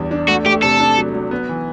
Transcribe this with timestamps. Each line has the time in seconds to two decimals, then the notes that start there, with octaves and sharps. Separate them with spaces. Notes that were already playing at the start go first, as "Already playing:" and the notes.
Already playing: E2 G3 D4
0.11 D4
0.28 A3 F#4
0.45 A3 G4
0.62 C3 A4
0.80 D4
0.98 F#3
1.14 F#3
1.31 B3
1.49 E3